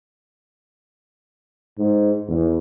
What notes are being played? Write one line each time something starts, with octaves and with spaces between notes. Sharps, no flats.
G#2
E2